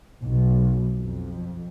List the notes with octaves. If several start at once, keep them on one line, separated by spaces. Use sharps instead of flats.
B1
F2